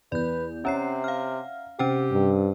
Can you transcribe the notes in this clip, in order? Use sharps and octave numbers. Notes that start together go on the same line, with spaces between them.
E2 B4 D5 G6
C3 C#4 C#5 E5 F#5 A#5 C7
F5 F6
C3 C#4 G4 C5 G5
G2